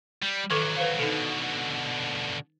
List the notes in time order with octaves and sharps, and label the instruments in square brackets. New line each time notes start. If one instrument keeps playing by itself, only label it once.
[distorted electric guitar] G3
[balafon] D#3 A4 D6 [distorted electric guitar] E3 F#3
[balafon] B4 C5 F5
[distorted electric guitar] B2 D3 [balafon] D#4 A4